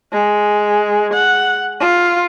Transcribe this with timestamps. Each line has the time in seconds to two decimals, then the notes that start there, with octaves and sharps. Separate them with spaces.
0.13 G#3
1.14 F#5
1.80 F4